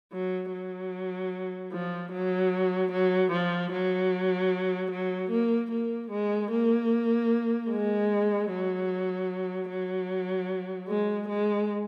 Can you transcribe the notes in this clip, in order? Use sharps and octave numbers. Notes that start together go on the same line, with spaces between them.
F#3
F#3
F3
F#3
F#3
F3
F#3
F#3
A#3
A#3
G#3
A#3
G#3
F#3
F#3
G#3
G#3